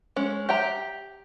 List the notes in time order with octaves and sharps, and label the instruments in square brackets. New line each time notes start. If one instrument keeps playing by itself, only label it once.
[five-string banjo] G#3 C#4
G4 E5 G5 A#5